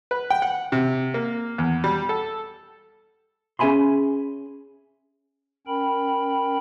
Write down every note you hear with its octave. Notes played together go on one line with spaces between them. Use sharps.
B4
G5
F#5
C3
A#3
E2
G3
A4
C#4 G#4 E5 G#5 B5 C6
C#4 A#4 G5 B5